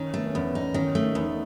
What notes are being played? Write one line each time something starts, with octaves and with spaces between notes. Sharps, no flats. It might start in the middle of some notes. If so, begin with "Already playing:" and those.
Already playing: D#3 C#4
A3 B3
C#4
E2 B3
C#4 D#4
D#3 C#4
A3
E2 D#4